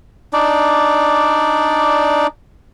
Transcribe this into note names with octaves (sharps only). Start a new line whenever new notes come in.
D4 D#4 D5